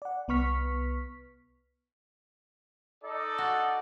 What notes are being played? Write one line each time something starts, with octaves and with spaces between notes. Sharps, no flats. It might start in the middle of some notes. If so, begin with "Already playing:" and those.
D5 F#5
C2 B3 B4 C#6 F6 B6
D#4 A4 D5
F#4